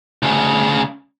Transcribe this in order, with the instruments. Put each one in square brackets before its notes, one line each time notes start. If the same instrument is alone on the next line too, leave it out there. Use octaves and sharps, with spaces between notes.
[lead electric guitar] D2 C#3